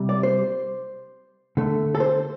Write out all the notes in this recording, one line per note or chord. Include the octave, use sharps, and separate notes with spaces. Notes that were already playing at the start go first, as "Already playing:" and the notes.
Already playing: C3 G3
D5
C5
D3 A3
A4
C5